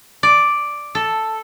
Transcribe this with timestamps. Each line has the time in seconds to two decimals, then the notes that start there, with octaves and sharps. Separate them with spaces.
0.23 D5
0.95 A4